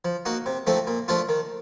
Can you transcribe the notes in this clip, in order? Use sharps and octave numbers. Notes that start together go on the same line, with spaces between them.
F3
A#3 D#4 F#4
C3
F3 A3 C4 D#4
A#2
F3 A3 D4 F4
D#3